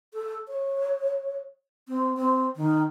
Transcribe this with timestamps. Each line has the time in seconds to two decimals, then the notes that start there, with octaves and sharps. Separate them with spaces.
0.14 A4
0.48 C#5
1.88 C4
2.17 C4
2.56 D#3